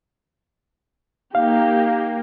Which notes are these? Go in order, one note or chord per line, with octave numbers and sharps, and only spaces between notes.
A#3 D#4 G4 F5